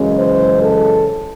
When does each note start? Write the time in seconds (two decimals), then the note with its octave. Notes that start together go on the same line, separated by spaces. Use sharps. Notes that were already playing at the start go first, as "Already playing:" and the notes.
Already playing: F#2 C#3 E3 G#3 C#4
0.17 C5
0.62 A4